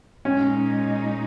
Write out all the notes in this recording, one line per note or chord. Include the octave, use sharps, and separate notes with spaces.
A#2 G#3 C#4 D#4